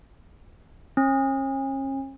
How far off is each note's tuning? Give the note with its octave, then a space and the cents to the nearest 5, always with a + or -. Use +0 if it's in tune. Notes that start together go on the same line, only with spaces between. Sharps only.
C#4 -40